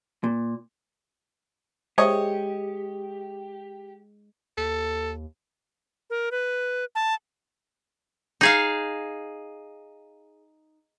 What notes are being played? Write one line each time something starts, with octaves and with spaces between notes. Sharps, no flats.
A#2
G#3 G4 C5 C#5 D#5 E5
D#2 A4
A#4
B4
A5
D#4 G#4 F5